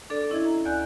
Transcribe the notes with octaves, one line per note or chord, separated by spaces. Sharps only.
D4 A4 D5
C#4 E4 D#5 E5 G#6
A#5
D2 D5 G#5 F#6 G6